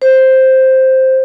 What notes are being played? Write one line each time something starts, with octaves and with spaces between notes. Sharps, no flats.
C5